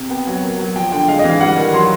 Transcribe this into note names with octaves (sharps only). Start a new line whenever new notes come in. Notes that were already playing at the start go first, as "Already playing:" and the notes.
Already playing: C3
B3 G5
F#3
A#3
F#3
F3 G5
D3 G5
G#3 F5
D#5
E3
F5
G3 F#5
D#3
F#3 C6